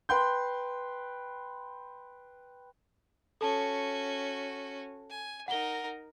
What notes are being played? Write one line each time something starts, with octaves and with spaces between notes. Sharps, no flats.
B4 G5 C6 G6
C#4 F#4 A4 A5
G#5
D#4 A#4 F#5 G7